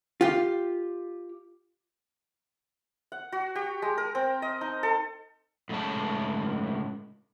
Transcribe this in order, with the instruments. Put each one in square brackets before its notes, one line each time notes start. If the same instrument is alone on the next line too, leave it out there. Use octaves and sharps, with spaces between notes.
[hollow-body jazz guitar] F4 G4
[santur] F#5
F#4
G4
G#3
A#4
C4
D#5
D#4
A4
[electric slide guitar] A2 C#3 G#3 C#5 A5